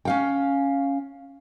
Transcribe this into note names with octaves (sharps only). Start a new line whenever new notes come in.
C#4 F5 G5